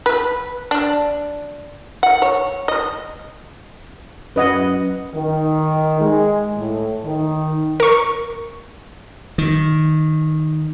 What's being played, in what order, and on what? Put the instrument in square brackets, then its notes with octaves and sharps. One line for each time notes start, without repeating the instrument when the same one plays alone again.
[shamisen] B4
D4
F#5
C#5
D#5
[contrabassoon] F#2 [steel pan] B4 D#5 F#5
[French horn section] D#3
G#3
A2
D#3
[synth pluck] A#4 C#6
[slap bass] D#3